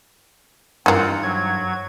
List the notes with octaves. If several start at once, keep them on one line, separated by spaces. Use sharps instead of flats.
G2 D#3 E3 C4 F4 C5 F5 F#5
F#3 G#6